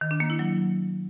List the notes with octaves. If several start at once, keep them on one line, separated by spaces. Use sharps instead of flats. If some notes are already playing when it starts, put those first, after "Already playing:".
D#3
D4
A#3
E4
F#3